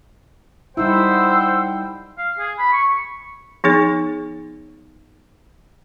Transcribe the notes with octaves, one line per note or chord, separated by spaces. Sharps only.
G3 D#4 E4 C5 F#5 G5 E6
F5
G#4
B5
C#6
F3 B3 D#4 G#4 C#5